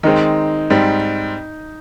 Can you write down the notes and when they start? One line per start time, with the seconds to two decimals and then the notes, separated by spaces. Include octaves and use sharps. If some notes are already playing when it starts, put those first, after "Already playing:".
0.03 D#3 G#3 C4 D#4
0.70 G#2 G3 C4